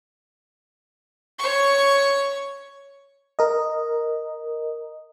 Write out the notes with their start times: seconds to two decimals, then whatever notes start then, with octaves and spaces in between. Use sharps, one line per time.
1.39 C#5 C#6
3.39 A#4 D#5